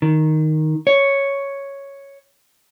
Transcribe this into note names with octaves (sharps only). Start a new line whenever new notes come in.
D#3
C#5